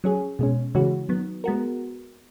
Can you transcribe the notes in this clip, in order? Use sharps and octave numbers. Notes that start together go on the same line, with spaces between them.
F#3 C#4 G#4
B2 G#3 C#4
C#3 E3 G#3 C#4 F#4
D#3 F#3 B3
G#3 B3 F#4 A#4